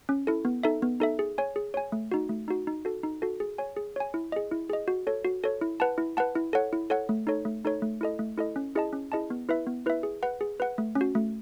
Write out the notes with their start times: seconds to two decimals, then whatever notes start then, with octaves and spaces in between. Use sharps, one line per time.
0.09 C#4
0.27 E4 A4
0.45 B3
0.63 D#4 A4 E5
0.82 B3
1.00 D#4 A4 E5
1.19 G#4
1.38 C#5 G#5
1.56 G#4
1.74 C#5 G#5
1.92 A3
2.12 D#4 F#4
2.29 A3
2.48 D#4 F#4
2.67 D#4
2.85 F#4 A4
3.03 D#4
3.22 F#4 A4
3.40 G#4
3.58 C#5 G#5
3.77 G#4
3.96 C#5 G#5
4.14 E4
4.32 G#4 D#5
4.51 E4
4.70 G#4 D#5
4.88 F#4
5.07 A4 C#5
5.25 F#4
5.44 A4 C#5
5.61 E4
5.80 B4 F#5 A5
5.98 E4
6.17 B4 F#5 A5
6.35 E4
6.53 A4 C#5 F#5
6.73 E4
6.90 A4 C#5 F#5
7.09 A3
7.27 D#4 A4 C#5
7.45 A3
7.65 D#4 A4 C#5
7.82 A3
8.01 E4 A4 D#5
8.19 A3
8.38 E4 A4 D#5
8.56 C#4
8.75 E4 G#4 D#5 A5
8.93 C#4
9.12 E4 G#4 D#5 A5
9.30 B3
9.49 E4 B4 E5
9.67 B3
9.86 E4 B4 E5
10.03 G#4
10.23 B4 F#5
10.41 G#4
10.60 B4 F#5
10.78 A3
10.95 C#4
11.01 F#4
11.15 A3